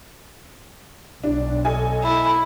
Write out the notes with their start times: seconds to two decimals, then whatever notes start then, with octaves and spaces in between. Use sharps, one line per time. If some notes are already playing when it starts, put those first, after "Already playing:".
1.24 B1 D4
1.65 A4 D#5 G#5
2.04 E4